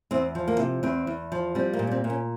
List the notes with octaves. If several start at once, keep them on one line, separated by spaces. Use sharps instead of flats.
E2 C4
F3
A#3
C3
E2 C4
E2
F3
G3 C4
A#3
A#2
C#4
C4
A#2
C#4